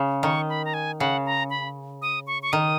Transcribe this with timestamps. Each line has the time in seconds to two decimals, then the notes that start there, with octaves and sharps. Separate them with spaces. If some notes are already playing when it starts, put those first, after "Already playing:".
Already playing: C#3
0.23 D#3 C#6
0.49 B5
0.65 A#5
0.74 G#5
0.99 C#3 F#5
1.26 A#5
1.50 B5
2.02 D#6
2.27 C#6
2.43 C#6
2.52 D#3 D#6